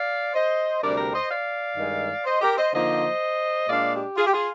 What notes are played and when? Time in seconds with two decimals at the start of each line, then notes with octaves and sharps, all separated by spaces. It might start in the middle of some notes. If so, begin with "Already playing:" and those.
Already playing: D5 F5
0.34 C5 D#5
0.82 D2 C3 G3 D4 A#4 D5
0.97 G4 A#4
1.14 C5 D#5
1.29 D5 F5
1.77 G2 D#3 G#3 D#4
2.25 C5 D#5
2.41 G4 A#4
2.57 C5 D#5
2.73 D3 F3 A#3 D#4 C5 D#5
3.69 A#2 G#3 D4 D5 F5
3.94 G4
4.17 F4 G#4
4.27 G4
4.33 F4 G#4